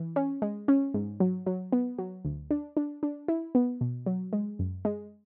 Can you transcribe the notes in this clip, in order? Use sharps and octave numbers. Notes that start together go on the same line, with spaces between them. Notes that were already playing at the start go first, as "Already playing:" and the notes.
Already playing: E3
C#4
G#3
C#4
G#2
F#3
F#3
B3
F#3
D2
D4
D4
D4
E4
B3
B2
F#3
G#3
F#2
G#3